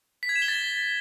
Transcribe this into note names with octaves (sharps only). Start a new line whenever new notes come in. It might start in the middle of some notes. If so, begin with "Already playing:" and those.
B6
G#6
E7
G7
A6